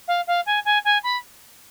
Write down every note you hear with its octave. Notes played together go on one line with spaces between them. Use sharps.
F5
F5
G#5
G#5
G#5
B5